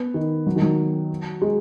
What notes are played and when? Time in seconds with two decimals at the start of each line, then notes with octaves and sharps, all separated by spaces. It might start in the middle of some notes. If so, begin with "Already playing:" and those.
Already playing: B3
0.14 D#3
0.47 F#3
0.56 D#3
0.62 F#3
1.42 G#3